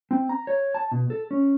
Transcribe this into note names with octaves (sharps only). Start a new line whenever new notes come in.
C4
A#5
C#5
A5
B2
A4
C#4